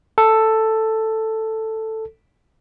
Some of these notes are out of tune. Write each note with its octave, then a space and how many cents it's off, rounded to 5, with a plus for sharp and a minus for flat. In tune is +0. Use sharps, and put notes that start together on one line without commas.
A4 +5